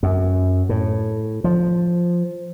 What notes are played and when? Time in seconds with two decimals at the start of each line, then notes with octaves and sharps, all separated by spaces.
0.03 F#2
0.69 A2
1.44 F3